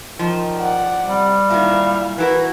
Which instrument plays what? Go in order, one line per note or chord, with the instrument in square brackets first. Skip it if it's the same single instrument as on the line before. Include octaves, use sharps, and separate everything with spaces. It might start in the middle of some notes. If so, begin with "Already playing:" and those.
[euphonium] D#3 [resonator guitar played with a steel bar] F3
[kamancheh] D5 F#5
[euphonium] C3 [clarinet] G3
[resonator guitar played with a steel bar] A#2 D#3 [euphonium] E4 [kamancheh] E5 F5
[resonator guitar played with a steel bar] E3 E4 A#4 [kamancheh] F#4 [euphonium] B4